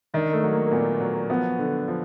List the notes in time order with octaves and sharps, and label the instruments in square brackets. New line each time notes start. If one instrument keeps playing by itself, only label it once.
[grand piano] D#3 [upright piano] D4
[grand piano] A3
[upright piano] F#3
[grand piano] A#3
A#3
[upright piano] A#2 [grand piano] B3
[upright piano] F#3
[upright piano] F3 [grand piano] B3
[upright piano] D3
F3